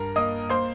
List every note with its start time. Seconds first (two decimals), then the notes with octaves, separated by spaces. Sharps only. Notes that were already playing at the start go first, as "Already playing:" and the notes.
Already playing: G2 A#4 A#5
0.16 A#3 D#5 D#6
0.49 A#3 C5 C6